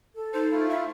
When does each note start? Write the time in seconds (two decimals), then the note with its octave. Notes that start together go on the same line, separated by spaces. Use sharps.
0.15 A4
0.34 D#4 C5
0.51 A3 E4 F4
0.70 E5